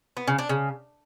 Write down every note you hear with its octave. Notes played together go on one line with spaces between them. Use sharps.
B3
C#3
D4
C#3